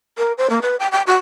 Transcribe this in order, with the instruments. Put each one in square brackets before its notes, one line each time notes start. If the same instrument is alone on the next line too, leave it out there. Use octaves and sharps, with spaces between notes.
[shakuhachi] A#4
C5
A#3
B4
G5
G5
F#4